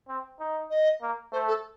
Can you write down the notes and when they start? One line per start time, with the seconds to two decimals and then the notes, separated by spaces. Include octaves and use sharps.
0.08 C4
0.39 D#4
0.70 D#5
1.01 A#3
1.32 A3 C5
1.48 A4